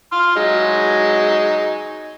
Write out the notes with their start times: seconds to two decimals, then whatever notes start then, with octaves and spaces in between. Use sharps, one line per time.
0.12 C6 F6
0.36 F#3 G#3 D#4